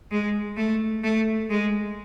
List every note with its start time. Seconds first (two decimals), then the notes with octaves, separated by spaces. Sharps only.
0.11 G#3
0.57 A3
1.04 A3
1.50 G#3